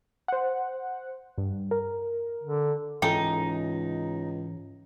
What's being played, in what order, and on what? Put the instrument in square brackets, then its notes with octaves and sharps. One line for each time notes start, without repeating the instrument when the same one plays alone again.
[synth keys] C5 F#5
G2
A#4
[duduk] D3
[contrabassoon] C#2 [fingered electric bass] G#2 E3 C#4 [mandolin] D#4 [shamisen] A4 G5